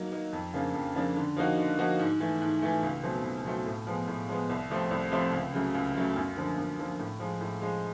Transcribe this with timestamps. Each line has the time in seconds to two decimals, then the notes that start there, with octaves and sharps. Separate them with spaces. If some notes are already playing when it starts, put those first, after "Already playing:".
Already playing: F#3 A#3 D#4
0.12 A#3 D#4
0.33 F2
0.53 C#3 F3 A#3 D4
0.75 F2
0.96 C#3 F3 A#3 D4
1.16 D3
1.36 F3 A#3 D#4 F#4
1.58 D3
1.79 F3 A#3 D#4 F#4
1.99 G#2
2.20 E3 A3
2.42 G#2
2.62 E3 A3
2.83 C#2
3.03 B2 F#3 A3 C4
3.24 C#2
3.45 B2 F#3 A3 C4
3.66 A2
3.87 F3 G#3 B3
4.08 A2
4.29 F3 G#3 B3
4.50 C2
4.70 C3 F3 A3 C4
4.91 C2
5.12 C3 F3 A3 C4
5.33 C#2
5.54 C#3 F#3 A3
5.75 C#2
5.95 C#3 F#3 A3
6.16 F#2
6.37 D3 F3 A#3
6.58 F#2
6.79 D3 F3 A#3
7.00 A2
7.20 F3 G#3
7.41 A2
7.62 F3 G#3